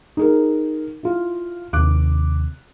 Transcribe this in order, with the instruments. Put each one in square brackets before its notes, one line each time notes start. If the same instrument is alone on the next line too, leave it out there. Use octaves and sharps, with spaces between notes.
[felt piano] D#4 G#4 A#4
E4 F4
[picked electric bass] D#2 C3 [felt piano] D6 F#6